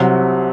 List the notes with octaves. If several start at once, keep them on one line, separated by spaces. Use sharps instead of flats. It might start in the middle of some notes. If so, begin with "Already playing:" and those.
Already playing: C2 C3 F#3